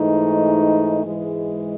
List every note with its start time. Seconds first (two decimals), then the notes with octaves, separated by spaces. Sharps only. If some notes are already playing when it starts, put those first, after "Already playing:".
Already playing: G#2 E3 A3 D#4
1.03 G#2 E3 G#3